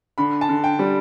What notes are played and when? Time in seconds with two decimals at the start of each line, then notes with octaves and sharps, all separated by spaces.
0.18 D3 B5
0.41 A5
0.49 D3
0.64 G5
0.79 G3